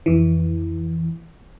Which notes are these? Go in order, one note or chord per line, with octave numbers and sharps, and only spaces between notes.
F2 E3